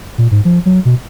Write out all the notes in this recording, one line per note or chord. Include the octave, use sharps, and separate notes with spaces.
A#2
G#2
F3
F#3
B2